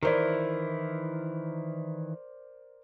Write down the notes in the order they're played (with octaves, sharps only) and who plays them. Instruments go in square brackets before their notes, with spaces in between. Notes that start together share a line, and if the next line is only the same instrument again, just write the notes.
[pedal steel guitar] D#3 E3 E4 [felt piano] A#4 C5 D5